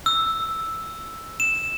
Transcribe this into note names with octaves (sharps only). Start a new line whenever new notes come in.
E6
E7